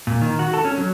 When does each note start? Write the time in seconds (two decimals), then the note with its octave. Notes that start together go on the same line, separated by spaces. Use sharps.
0.07 A#2
0.22 D#3
0.39 F#4
0.54 A4
0.65 C#4
0.78 F#3